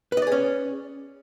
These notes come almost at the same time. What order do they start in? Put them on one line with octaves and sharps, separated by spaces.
B4 D#5 D5 G#4 C#4